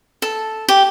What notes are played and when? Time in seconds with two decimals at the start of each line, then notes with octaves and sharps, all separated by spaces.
0.22 A4
0.69 G4